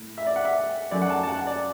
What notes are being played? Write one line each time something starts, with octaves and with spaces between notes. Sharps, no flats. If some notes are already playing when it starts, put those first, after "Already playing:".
Already playing: A2
E5
D5
F#5
E5
F#2 F#3 A3 D5
F#5
A5
A5
F#5
D5